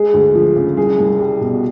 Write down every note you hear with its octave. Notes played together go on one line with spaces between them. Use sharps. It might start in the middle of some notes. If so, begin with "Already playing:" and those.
Already playing: G#3 G#4
D2
F3
C#3
C2 G#4
C2
G3
B2
F#4